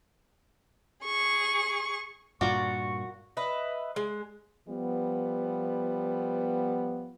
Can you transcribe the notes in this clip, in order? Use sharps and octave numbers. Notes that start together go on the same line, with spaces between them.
G#4 C#6
G2 A#2 A#3 F4 F#4 D5 C#6
B4 D#5 E5
G#3
F3 G3 B3